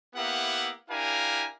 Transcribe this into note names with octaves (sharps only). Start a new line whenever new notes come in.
A#3 B3 E4 G4 E5 F#5
D4 E4 G4 A#4 F5 G#5